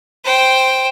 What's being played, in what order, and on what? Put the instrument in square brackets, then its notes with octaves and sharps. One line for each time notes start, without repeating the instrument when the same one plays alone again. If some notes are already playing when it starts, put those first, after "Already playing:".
[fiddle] C5 G5